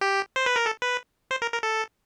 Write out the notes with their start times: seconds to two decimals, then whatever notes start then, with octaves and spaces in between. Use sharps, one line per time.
0.01 G4
0.36 C5
0.46 B4
0.56 A#4
0.66 A4
0.82 B4
1.31 C5
1.42 A#4
1.52 A#4
1.63 A4